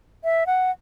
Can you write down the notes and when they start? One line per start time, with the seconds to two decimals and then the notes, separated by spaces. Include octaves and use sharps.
0.24 E5
0.47 F#5